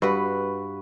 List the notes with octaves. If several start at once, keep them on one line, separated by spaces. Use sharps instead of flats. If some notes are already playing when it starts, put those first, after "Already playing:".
G2 F#4 B4 F#5